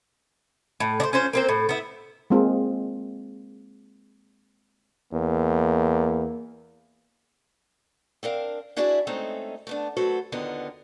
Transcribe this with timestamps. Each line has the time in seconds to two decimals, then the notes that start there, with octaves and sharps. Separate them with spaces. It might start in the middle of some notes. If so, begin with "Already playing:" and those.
0.80 A2
1.00 D4 C5
1.13 C#4 F4 C5
1.33 A#3 C4 C5
1.49 A2
1.69 B3 E4
2.30 G#3 A#3 C4 F4 G#4
5.13 E2 A#3
8.23 C4 D4 A#4 F5
8.76 D4 E4 F#4 G#4 D5 E5
9.07 G#3 A3 C4 C#4 D#4 A4
9.67 A3 B3 D4
9.97 F#3 A3 F#4 A4 B4 C5
10.32 D#2 D3 D#3 B3 F4 D#5